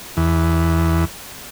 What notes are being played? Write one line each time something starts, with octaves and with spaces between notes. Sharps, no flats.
E2